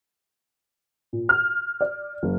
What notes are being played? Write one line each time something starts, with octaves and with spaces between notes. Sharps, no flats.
A#2
F6
D5
F#1